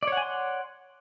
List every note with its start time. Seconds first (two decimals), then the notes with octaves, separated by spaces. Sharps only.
0.03 D5
0.07 C#5
0.12 F#5
0.17 G#5
0.22 C6